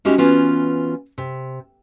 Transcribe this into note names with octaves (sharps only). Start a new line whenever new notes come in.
G#3 C#4 D#4 E4 F#4 G4
E3 B3 C#4 F4 F#4
C3